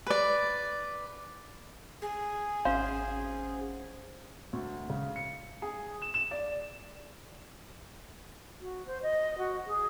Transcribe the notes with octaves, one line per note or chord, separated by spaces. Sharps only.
B4 D5
G#4
G#1 C#4 C5 F5 F#5
D2
C#3
C#7
G#4
E7
E7
D5
F#4
C5
D#5
F#4
G#4